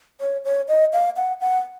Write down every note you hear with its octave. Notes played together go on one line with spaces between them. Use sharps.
C#5
C#5
D#5
F5
F#5
F#5